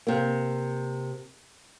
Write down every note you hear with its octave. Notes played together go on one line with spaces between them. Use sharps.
C3 A#3